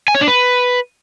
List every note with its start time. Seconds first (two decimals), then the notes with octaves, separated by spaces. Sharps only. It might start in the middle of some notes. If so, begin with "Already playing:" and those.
0.08 G#5
0.15 C#5
0.21 D4
0.28 B4